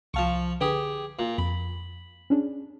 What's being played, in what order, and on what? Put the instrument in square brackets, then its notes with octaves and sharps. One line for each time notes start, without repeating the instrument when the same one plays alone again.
[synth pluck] C2 A5 [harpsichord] F3 F5 C#6
[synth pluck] D3 B4 [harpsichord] G4 G#4
[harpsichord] A#2
[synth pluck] F2 [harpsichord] B5
[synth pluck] C#4 D4 G#4